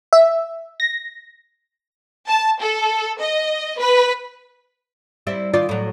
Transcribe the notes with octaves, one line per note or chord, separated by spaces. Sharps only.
E5
A#6
A5
A4
D#5
B4
G3 C4 E4
D#3 F4 D5
A2 F#3